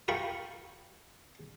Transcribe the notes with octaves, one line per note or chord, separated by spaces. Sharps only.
F4 A#4 G5 B5 C#6